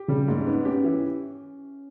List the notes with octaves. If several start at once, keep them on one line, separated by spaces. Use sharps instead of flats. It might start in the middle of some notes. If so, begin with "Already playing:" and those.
Already playing: G4
C#3 G3
G#2 A#3
C#4
B3 D#4
C#4 G4
E3